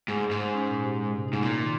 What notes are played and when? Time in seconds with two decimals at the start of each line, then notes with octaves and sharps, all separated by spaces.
0.08 G#2 G#4
0.23 G#3
0.31 G#2
0.38 C5
0.53 C#4
0.68 A#2
0.83 G4
0.98 G#3
1.14 C3
1.28 G#2 D#4
1.43 A#2 A#3
1.58 D#3